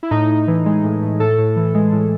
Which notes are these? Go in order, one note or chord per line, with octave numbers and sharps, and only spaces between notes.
E4
A2 D#4
A2
E3
G#3
A2
A2
A2 A4
A2
E3
G#3
A2